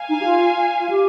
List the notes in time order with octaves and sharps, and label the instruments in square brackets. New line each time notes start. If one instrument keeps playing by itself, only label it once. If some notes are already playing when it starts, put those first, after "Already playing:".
Already playing: [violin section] F5 G#5
[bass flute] D#4
G4
F4
F4
G4